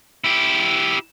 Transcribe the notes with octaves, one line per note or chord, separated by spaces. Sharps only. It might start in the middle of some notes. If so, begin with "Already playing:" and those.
E4 G4